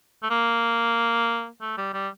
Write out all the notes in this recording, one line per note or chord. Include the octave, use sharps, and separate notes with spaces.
A3
A#3
A3
G3
G3